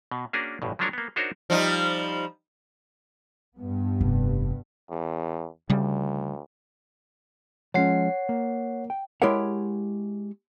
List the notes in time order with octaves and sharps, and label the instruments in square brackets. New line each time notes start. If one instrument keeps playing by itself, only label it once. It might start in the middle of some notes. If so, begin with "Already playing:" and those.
[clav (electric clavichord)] B2
A#3 C#4 D4 F#4 G#4 A#4
A1 G2 B2
F3 F#3 G#3 D4 A#4 C#5
A#3 B3
D4 D#4 F#4 A#4 C5 C#5
[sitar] F3 G3 D#4
[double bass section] G2 B3
[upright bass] F1
[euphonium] E2
[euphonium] D2 [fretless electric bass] C#3 G3
[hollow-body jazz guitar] F3 G#3 C#4 [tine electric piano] C#5 F#5 C7
[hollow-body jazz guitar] A#3
G5
G#3 E4 G4 A#4 C#5 F#5